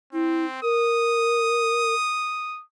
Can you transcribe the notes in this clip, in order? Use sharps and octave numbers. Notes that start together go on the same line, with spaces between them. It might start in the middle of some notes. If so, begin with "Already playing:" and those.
C4 E4
A#4 D#6